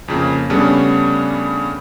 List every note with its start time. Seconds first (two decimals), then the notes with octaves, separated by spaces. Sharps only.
0.08 F2 C#3 A#3
0.50 C#3 G3 A3 B3 C#4 D4